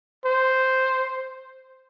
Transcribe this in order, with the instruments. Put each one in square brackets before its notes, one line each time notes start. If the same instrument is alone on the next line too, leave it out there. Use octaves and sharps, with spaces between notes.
[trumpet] C5